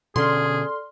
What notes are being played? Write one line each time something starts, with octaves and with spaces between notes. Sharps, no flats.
B2 D3 C#4 G#4 A4 D5 C6 F6